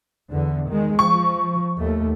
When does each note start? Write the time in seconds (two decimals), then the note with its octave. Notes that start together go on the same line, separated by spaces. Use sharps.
0.30 E2 D3
0.68 D#3 G#3
0.99 F3 C#6
1.78 D#2 A3